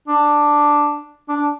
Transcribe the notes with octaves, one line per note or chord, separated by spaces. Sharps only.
D4
D4